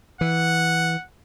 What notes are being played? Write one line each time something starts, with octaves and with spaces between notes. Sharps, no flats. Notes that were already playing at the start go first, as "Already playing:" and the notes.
E3 F#5